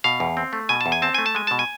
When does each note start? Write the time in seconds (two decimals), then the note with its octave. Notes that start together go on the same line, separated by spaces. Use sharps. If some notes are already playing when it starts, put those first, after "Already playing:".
0.04 B2 F5
0.20 E2
0.37 C4
0.53 A3
0.69 B2 G#5
0.81 A5
0.86 E2
0.92 G#5
1.02 C4 A5
1.14 A3 G#5
1.26 A5
1.35 G#3 G#5
1.47 B2 A5
1.59 G#5